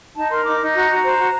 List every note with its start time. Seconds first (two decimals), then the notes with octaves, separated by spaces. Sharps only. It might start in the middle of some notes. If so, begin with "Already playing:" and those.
0.16 D#4 A5
0.31 A#4 C6
0.45 D#4 D6
0.60 D#4
0.74 F#4 A#5
0.90 F#4
1.04 C5
1.18 F#4